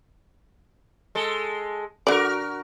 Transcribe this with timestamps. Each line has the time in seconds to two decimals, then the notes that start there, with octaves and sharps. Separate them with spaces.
1.15 G#3 A4
2.07 D3 F#4 A#4 D5